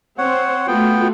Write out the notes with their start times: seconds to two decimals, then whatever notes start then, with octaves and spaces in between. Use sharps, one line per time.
0.18 C4 C5 C#5 F#5
0.67 A3 B3 F4 F#4 G5